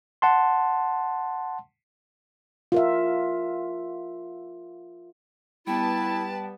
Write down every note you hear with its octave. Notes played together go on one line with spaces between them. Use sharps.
F#5 A5 C6
F4 A#4 E5
G3 B3 E4 B4 G5 A5